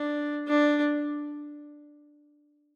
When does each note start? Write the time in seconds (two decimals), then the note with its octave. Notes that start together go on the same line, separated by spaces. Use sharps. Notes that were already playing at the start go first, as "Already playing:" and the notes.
Already playing: D4
0.48 D4